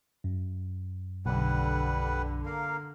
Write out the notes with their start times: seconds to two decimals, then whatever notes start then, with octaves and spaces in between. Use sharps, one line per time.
0.24 F#2
1.26 B1 D3 G3 B4 F#5
2.46 A#3 A#4 F5